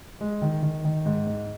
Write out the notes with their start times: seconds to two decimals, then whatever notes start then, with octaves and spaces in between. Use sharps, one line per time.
0.21 G#3
0.42 D#3
0.63 D#3
0.85 D#3
1.05 G#2
1.27 G#2